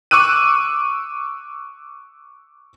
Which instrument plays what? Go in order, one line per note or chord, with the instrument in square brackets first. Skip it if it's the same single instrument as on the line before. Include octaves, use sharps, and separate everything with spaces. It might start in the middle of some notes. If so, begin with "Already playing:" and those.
[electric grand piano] C#6 D6 E6 F#6 D#7